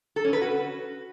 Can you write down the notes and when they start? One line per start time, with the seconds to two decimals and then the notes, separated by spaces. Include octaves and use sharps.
0.16 A4
0.25 C#4
0.33 B4
0.41 F#4